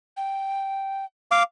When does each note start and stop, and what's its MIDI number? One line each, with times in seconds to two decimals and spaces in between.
0.17 1.05 79
1.31 1.43 77
1.31 1.43 86